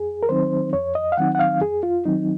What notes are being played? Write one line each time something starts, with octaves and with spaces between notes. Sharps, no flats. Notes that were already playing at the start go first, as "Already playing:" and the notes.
Already playing: F2 G#4
A#4
D#3 F#3 C4 D#4 C5
F2 C#5
D#5
F5
D#3 F#3 C4 D#4 F#5
F#5
F5
F2 G#4
F4
D#3 F#3 C4 D#4